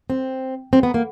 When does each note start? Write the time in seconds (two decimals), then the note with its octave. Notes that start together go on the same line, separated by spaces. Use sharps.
0.10 C4
0.73 C4
0.83 B3
0.94 A#3